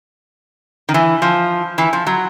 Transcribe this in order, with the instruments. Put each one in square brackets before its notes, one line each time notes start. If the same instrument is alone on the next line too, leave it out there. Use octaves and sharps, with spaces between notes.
[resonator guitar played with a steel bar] D#3
E3
F3
E3
F3
F#3